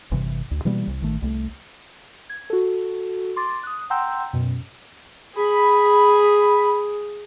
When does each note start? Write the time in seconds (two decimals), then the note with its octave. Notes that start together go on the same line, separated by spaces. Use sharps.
0.11 G1 G2 C3 E3
0.51 D2
0.65 B2 E3 G3 A#3
0.87 C2
1.01 A1 D#3 A3
1.22 C2 A3
2.30 G#6
2.50 F#4 A4
3.36 C6 D6 A6
3.63 D#6 F#6
3.90 F#5 G5 A#5 C6 E6 G6
4.33 F#2 B2
5.36 G#4 B5